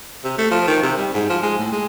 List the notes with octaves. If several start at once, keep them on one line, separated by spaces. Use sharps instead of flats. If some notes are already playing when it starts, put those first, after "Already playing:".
C3
A3
F3
D#3
C3
G3
G#2
F3
G#3
A2
G#3